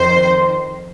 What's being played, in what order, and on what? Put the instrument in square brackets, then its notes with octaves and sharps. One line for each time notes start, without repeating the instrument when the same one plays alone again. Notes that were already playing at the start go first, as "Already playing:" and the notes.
Already playing: [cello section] F2 D#3 C5